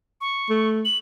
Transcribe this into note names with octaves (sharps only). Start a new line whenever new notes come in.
C#6
A3
F#7